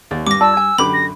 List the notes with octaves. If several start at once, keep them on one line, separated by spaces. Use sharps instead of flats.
D#2 D5
G2 D6 A#6
F4 D5 A5 E6
G#5
F#2 D3 G4 B5 D6
A#6